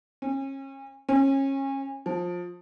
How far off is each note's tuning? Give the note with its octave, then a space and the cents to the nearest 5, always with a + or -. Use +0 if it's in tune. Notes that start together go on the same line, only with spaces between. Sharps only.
C#4 -35
C#4 -30
F3 +20